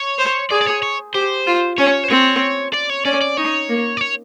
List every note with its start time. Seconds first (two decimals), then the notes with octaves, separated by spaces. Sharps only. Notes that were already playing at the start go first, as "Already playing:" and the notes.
Already playing: C#5
0.18 C5
0.51 G#4 D5
0.61 D5
0.67 C#5
0.82 C#5
1.14 G4 C5
1.47 F4
1.78 C#4 C#5
2.04 C5
2.10 C4 C#5
2.74 D5
2.90 C#5
3.05 C#4 D5
3.21 D5
3.37 D#4 C#5
3.69 A#3
3.97 D5
4.01 C#5